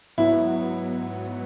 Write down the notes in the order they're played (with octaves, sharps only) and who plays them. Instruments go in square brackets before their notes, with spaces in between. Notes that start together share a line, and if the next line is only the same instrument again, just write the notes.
[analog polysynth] G#2 F#3 B3 [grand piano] E4
[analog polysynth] F#3 B3